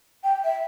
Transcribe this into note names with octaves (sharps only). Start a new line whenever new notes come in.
G5
E5